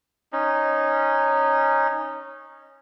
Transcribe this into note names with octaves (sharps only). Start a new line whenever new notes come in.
C#4 D#4